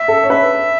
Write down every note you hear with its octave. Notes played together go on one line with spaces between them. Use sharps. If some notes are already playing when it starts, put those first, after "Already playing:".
Already playing: E5
A4
C#5
B4 E5